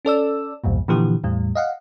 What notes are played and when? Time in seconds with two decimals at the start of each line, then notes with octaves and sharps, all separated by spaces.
0.05 C#4 A4 D5 E6
0.64 B1 E2 G2 A#2
0.88 A#2 D3 E3 F3 G4
1.24 E2 A2 G3
1.55 D#5 F5 F#5